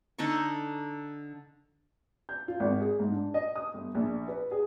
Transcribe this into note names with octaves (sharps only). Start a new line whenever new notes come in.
D3 D#4 A4 C#6
G6
F4
G#1
G#4
G#2
D4
D#5
D#6
G1
A#1
B4
G#4